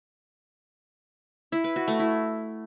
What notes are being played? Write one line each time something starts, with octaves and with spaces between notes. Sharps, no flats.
E4
B4
F#4
A3
E4